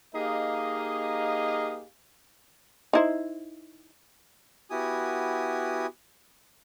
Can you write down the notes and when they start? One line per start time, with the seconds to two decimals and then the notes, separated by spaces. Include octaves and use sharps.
0.15 A#3 D#4 G4 G#4 D#5 F5
2.93 D#4 E4 C5
4.70 B3 E4 F#4 G4 G#5 D#6